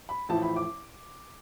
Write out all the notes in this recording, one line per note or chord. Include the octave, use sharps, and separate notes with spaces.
B5
A1 A2 F3 A5
B5
D6